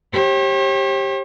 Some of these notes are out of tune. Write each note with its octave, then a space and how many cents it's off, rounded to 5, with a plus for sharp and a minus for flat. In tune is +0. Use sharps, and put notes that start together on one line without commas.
G4 +0 C#5 -45